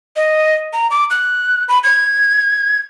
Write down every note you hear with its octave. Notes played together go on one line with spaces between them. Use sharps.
D#5
A#5
D6
F#6
B5
G#6